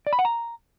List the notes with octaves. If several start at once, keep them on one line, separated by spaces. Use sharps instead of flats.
D5
B5
F#5
A#5